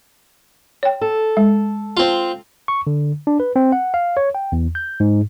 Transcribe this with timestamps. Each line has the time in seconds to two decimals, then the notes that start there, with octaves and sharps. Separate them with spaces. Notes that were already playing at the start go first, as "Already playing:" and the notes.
0.83 C#5 G5
1.01 A4
1.37 G#3
1.97 C4 F4
2.68 C#6
2.87 D3
3.27 D4
3.40 B4
3.56 C4
3.72 F#5
3.94 F5
4.17 C#5
4.35 G5
4.52 E2
4.75 G6
5.00 G#2